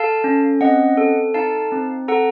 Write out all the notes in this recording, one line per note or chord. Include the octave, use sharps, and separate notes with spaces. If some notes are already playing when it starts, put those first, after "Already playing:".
Already playing: A4 F5 A5
C#4
C4 D#5 F#5
A4
D#4 F5 A5
C4
A4 F#5 A#5